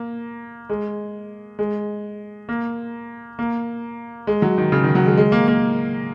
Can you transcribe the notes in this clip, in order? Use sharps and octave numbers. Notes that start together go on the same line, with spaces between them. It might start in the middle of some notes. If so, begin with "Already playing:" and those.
Already playing: A#3
G#3
G#3
A#3
A#3
G#3
F#3
D#3
C#3
D#3
F#3
G#3
G#3
A#3
A#3